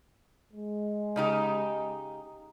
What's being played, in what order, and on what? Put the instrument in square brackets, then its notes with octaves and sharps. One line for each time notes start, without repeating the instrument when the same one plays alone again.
[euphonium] G#3
[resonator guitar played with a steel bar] C#3 D#4 G4